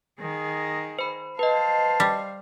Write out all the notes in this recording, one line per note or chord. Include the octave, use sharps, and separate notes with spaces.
D#3 G#4
C5 B5
B4 C5 D#5 F5 A5
G3